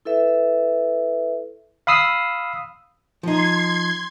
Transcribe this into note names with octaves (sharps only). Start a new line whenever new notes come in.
E4 A4 B4 E5
F5 B5 D#6 E6 C7
F3 D#4 C6 G#6